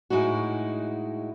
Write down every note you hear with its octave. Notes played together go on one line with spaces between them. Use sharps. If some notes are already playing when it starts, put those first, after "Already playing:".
A2 G#3 D#4 E4 F#4